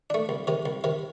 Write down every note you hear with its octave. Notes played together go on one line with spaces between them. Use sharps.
A3 D4
C2
C3 D#3
C2
C3 D#3